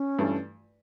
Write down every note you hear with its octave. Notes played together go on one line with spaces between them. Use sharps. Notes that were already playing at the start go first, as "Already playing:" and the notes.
Already playing: C#4
G2 E3 A3